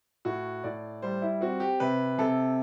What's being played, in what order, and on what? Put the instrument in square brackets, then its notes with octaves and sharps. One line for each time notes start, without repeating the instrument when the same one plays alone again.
[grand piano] A2 F#4
A2 D5
G3 C5
E4
C4 F#4
G4
C3 B4
C3 A4